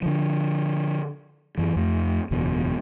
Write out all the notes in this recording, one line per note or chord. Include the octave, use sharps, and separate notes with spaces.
D3 F3
F#2 E3
F2 A3
F#1 E2 B2